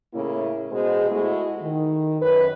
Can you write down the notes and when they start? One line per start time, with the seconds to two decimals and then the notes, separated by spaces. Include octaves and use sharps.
0.14 A2 C#3 A#3 E4
0.72 B2 G#3 F#4 G#4 C5
1.11 G#3 A3 E4 F#4 G#4
1.63 D#3
2.22 F#2 B4